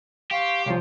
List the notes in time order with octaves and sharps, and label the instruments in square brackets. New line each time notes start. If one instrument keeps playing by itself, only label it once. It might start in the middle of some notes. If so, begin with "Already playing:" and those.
[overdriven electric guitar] G4 [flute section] F5 C6 C#6
[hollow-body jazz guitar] C2 F3 [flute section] C#5 F5